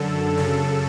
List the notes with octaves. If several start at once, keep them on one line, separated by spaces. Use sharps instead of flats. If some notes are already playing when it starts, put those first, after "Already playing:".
Already playing: F#2 D3 A4
F#2 C#3 A4